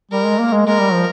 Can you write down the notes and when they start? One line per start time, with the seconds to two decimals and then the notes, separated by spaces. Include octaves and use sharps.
0.11 G3 A#4
0.25 G#3
0.39 A#3
0.53 G#3
0.67 G#3 A#4
0.80 G3
0.93 F3